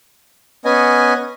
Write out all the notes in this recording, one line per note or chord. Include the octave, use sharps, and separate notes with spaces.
B3 C#4 D#5 G#5